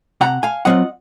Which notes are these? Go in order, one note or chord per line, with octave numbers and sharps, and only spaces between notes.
C3 F#5 A#5
F5 G#5
F#3 C4 F4 D#5 F#5